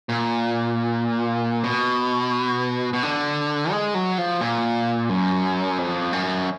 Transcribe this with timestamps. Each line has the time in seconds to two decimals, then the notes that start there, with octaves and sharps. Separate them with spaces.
0.09 A#2
1.64 B2
2.93 B2
3.03 D3
3.71 G#3
3.94 F#3
4.18 F3
4.41 A#2
5.09 F#2
5.78 F2
6.13 F#2